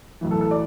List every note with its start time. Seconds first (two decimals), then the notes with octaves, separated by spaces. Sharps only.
0.21 B1 A2 E3
0.31 A4
0.41 A4
0.51 D5